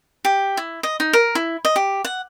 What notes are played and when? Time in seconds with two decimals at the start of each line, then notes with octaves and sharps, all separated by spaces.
0.25 G4
0.57 E4
0.83 D#5
1.00 D#4
1.13 A#4
1.35 E4
1.65 D#5
1.76 G4
2.05 F#5